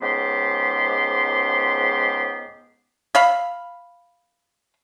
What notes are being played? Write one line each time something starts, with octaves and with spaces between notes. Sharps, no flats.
C#2 G#2 B3 G4 C6
E5 F5 B5